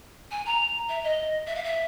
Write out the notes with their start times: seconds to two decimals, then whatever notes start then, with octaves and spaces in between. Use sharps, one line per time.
0.31 G#5
0.46 A#5
0.89 E5
1.03 D#5
1.46 E5
1.55 F5
1.64 E5